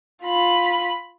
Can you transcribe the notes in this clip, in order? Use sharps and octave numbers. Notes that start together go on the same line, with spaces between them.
F4 B5